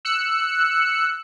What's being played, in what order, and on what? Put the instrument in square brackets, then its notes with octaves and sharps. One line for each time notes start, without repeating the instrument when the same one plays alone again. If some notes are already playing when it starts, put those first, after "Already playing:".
[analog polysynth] E6 F#6 C#7